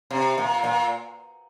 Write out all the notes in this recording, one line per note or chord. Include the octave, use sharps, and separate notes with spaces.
C3
A#2
A#2